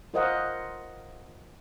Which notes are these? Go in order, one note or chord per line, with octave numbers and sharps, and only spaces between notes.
F4 A#4 C5 D#5 F5 F#5